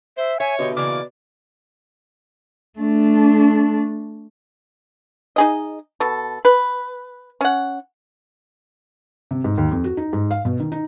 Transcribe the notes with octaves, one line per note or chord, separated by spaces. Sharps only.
C5 E5
C#5 E5 G#5
B2 D3 G4 D#5
C#3 E3 A#3 D5 D6
A3 D4
D#4 G#4 D#5
B2 A4
B4
C#4 F#5
C3
G#2
D#2
F2
F#4
D#4
G#2
F5
B2
D#3
D#4